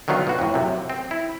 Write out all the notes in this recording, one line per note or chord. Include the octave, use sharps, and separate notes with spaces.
D3 D#3 F#3 B3 F4
B2 F#4
F2 A2
F#2 C3
C4
E4